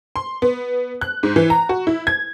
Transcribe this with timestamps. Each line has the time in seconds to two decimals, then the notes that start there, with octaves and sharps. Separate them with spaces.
0.16 C6
0.42 B3
1.01 F#6
1.23 G#2
1.36 E3
1.50 A#5
1.69 F#4
1.87 E4
2.07 G#6